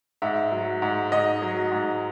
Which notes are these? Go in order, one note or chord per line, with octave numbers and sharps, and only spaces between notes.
G#2 E5
F#3
G#2
G#2 D#5
F#3
G#2